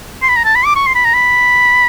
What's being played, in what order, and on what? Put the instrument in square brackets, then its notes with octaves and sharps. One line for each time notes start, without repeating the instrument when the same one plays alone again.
[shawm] C6
B5
A#5
A5
B5
D6
C#6
C6
B5
A#5
B5